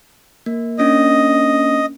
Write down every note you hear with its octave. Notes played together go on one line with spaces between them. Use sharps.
A#3
A#3 C#4 D4 D#5